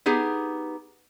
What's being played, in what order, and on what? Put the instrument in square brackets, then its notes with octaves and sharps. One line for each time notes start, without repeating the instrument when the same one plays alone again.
[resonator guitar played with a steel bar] B3 D#4 G4 G#4